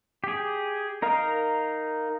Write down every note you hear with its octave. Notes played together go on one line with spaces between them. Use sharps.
G4 G#4
D#4 A#4 F5